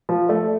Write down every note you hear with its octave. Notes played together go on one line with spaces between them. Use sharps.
F3
A3